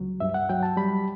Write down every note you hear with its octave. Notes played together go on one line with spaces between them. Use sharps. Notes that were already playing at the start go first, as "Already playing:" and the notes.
Already playing: C#2 F#3
G2 E5
F#5
F#3 G5
A5
G3 B5